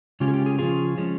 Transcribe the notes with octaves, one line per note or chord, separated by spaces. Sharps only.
C#3 G#3 C#4 F4 G4
G#4
G4
G#4
C#3 F3 A#3 F4 G#4
F3 G#3 C#4